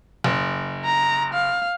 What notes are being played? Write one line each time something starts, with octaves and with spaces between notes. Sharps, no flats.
F#1
A#5
F5